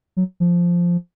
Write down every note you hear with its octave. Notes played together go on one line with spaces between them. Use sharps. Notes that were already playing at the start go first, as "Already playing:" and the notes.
F#3
F3